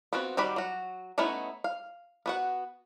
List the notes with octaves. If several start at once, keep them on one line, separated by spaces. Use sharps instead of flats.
B3 C4 F4 F#4
D#3 G3 F#4 D5 B5
F#3 F#4
A3 B3 C#4 D#4 E4
F5
B3 F#4 F#5